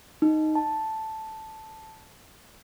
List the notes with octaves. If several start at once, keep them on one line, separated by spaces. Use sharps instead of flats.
D#4
A5